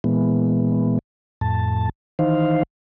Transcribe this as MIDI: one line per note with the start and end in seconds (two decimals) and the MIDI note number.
0.04 0.99 46
0.04 0.99 52
0.04 0.99 56
0.04 0.99 59
1.41 1.89 41
1.41 1.89 45
1.41 1.89 81
2.19 2.63 51
2.19 2.63 52
2.19 2.63 63
2.19 2.63 72
2.19 2.63 77